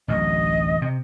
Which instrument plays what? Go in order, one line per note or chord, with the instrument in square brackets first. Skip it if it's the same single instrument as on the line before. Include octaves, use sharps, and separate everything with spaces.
[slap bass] A1 D2 F#3 [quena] D#5
[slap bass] C3